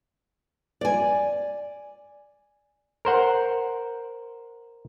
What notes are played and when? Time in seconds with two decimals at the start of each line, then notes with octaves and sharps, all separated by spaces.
0.81 D5 G#5
3.05 A#4 C5 F#5